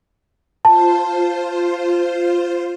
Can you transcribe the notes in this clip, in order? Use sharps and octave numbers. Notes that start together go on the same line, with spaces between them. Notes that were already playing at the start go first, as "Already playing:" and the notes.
F4 C5 A5